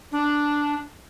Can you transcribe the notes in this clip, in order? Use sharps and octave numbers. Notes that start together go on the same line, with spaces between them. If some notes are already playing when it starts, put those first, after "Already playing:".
D4